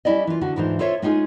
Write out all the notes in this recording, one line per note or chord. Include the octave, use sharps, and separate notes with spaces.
G3 C#4 E4 D5 D#5
E3 F4
D3 F#4
D2 G#2 E3 D#4 F4 C5
F4 A4 C5 C#5 E5
G#3 C#4 D#4 F4 G#4